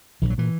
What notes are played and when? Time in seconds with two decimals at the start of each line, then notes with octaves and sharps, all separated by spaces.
0.22 A#1 E3
0.30 F#3
0.38 A#2 E3